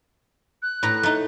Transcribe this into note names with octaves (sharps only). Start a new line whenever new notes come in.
F#6
A2 B4 A#5
A3 D#4